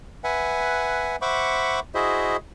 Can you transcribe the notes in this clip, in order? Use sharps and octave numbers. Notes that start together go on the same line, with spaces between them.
B4 E5 F#5 G#5
C5 E5 F#5 B5 C#6 D6
E4 F#4 G#4 C5 D#5 E5